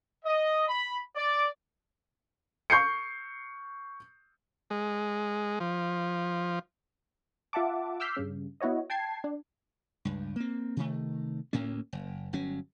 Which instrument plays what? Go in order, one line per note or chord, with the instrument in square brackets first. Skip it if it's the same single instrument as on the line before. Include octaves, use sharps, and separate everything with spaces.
[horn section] D#5
B5
D5
[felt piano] C#6 G6 C7 C#7
[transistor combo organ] G#3
F3
[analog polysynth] F4 E5 F#5 A5 D6
D6 E6 F6 G6 B6 C7
G2 C#3
B3 E4 F#4 C#5 D#5
G5 A5 G#6 C7
D4
[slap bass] C#2 G2
A#3 C4
C3 D#3 A3
D2 A2 A#3 C#4
F#1
G1 F#3 C#4